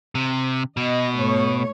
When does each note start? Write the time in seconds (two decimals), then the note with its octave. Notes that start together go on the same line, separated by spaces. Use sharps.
0.15 C3
0.77 B2 D#5
1.15 G#2 A3 C#5